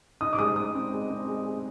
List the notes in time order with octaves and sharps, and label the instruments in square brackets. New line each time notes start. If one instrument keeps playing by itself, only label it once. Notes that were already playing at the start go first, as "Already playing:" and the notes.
[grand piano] D#4 [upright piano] D#6
[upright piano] D6
[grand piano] G#3 [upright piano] D#6
[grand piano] G#3 [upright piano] D#6
[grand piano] C4
G#3
C4
G#3
G#4